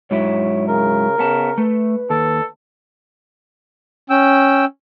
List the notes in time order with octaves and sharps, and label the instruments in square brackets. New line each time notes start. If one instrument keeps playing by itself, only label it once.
[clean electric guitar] G#2 F#3 E4 [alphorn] C#5
[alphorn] C#3 [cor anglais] A#4
[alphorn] C#3 [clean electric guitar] B3 A5
[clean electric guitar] A3 [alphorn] B4
[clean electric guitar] D#2 [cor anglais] A4
[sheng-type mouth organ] C#4 G5 E6